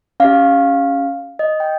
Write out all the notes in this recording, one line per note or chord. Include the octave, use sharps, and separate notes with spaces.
C#4 G4 F5
D#5
G5